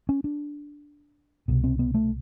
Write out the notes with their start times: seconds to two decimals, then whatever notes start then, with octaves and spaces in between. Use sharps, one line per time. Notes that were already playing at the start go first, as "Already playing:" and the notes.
0.09 C#4
0.24 D4
1.48 C2 B2
1.64 C4
1.79 B3
1.94 A3